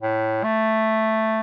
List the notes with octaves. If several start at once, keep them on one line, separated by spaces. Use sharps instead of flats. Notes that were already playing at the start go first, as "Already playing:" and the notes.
A2
A3